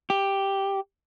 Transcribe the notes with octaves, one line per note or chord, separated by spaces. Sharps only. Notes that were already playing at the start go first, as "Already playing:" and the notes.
G4